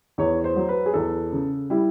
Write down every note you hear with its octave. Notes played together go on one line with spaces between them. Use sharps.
E2 C#5
C5
F#3
B4
G#4
E2 A4
C#3
G3 E4